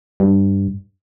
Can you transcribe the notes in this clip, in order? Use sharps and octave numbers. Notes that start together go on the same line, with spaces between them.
G2